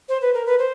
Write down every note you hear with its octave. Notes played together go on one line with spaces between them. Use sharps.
C5
B4
A#4
B4
C5